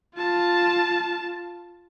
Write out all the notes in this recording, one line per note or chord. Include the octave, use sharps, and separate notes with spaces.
F4 A5